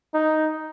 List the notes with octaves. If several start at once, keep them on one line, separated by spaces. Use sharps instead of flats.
D#4